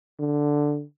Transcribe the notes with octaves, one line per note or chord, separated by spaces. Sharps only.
D3